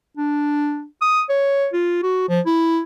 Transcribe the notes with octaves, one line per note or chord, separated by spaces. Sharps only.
D4
D#6
C#5
F4
F#4
F3
E4